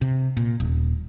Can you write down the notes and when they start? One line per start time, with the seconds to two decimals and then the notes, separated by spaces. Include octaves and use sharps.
0.01 C3
0.37 A#2
0.60 D#1